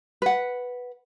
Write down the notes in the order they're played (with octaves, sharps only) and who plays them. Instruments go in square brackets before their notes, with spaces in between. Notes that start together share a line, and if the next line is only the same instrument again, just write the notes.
[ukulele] B4 F#5